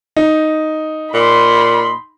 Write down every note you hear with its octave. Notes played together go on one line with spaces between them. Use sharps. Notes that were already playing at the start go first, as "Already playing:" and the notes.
D#4
A#2 B5 C6